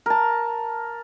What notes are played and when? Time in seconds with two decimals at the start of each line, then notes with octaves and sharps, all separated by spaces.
0.06 A#4 A5